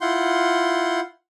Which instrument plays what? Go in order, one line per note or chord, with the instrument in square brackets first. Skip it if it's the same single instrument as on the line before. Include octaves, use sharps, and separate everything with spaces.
[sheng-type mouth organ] E4 F4 F#5 C6 G6